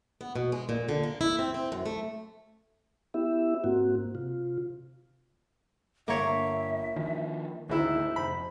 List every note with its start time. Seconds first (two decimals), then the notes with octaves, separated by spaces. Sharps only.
0.21 B3
0.36 B2
0.52 G#3
0.69 A#2
0.89 D3
1.03 A#3
1.21 E4
1.39 C4
1.54 C4
1.72 F#2
1.86 A3
3.14 B3 E4 G4 E5
3.64 G#2 A#3 C4 F#4
4.15 C3 F4
6.08 G1 A#3 C#5 E5
6.96 D#3 F3
7.69 D2 G#2 D#3 E4 C5
8.16 F1 B5